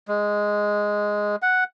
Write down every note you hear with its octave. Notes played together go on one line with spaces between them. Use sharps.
G#3
F#5